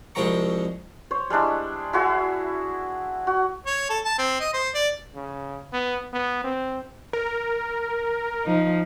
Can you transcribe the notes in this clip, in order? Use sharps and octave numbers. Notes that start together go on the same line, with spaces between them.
C2 F3 G#3 G5 A#5 C#6
C5 C#5
G3 G#3 D4 E4
E4 F#4 G#4 E5
F#4
C#5
A4
A5
C4
D#5
C5
D5
C#3
B3
B3
C4
A#4
F3 D#4